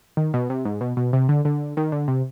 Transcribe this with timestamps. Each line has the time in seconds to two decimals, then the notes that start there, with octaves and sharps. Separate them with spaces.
0.17 D#3
0.34 B2
0.50 C3
0.65 G#2
0.81 B2
0.97 B2
1.13 C3
1.29 D3
1.45 D3
1.77 D#3
1.92 D3
2.08 C3